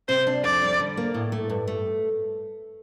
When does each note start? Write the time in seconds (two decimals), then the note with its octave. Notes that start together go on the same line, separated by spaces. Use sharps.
0.08 C3 C5
0.27 D4
0.44 F2 D5
0.62 G3
0.80 D3
0.97 A#3
1.14 A2
1.32 A3
1.50 G2
1.68 A3